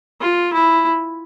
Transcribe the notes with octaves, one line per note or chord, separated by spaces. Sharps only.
F4
E4